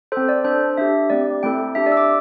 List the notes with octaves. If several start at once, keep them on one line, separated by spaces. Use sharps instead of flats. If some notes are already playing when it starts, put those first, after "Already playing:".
C4 A4 C5
D5
D4 A4 C5
D4 G4 E5
A3 C4 G4 D5
A3 C4 E4 A4 G5
D4 G4 E5
D5
E6
D6